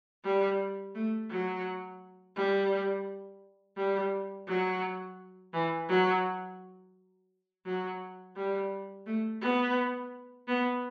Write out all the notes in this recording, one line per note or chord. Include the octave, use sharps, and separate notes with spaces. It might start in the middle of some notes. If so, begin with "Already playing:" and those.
G3
A3
F#3
G3
G3
F#3
E3
F#3
F#3
G3
A3
B3
B3